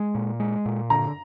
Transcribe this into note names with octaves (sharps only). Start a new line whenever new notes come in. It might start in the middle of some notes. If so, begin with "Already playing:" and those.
Already playing: G#3
A#2
G#3
A#2
D3 A#5